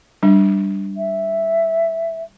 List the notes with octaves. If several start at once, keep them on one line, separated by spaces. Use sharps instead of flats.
G3 D4
E5